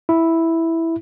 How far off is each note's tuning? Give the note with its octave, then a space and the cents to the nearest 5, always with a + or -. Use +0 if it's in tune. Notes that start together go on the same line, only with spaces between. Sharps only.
E4 -5